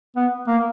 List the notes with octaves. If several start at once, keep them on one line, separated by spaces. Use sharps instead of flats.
B3
A#3